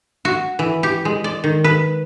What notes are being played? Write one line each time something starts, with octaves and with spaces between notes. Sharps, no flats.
F#4
E3
G4
G#3
D5
D#3
B4